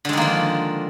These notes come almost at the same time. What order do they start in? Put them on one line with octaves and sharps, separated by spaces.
D3 G#3 D#3 A#3 F3